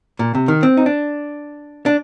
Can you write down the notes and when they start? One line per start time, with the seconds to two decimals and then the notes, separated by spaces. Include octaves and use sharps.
0.19 A#2
0.35 C3
0.48 D#3
0.63 C4
0.77 D#4
0.86 D4
1.86 D4